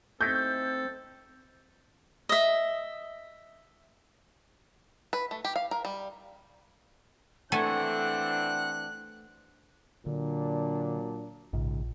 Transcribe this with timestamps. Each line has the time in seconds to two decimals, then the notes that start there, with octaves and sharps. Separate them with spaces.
0.21 A3 C4 D#4 E4 A4 G6
2.29 D#5 E5
5.13 B4
5.31 A3
5.45 G4
5.56 F5
5.71 A#4
5.85 G3
7.52 E3 A3 C4 D4 F#5 G#5 F#6
10.06 A#2 D3 F#3 D4
11.53 A#1 G#2 C#3